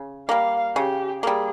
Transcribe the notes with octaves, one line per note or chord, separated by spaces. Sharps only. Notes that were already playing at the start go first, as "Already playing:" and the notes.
Already playing: C#3
G3 A#3 F5
C#3 G4
G3 A#3 G#4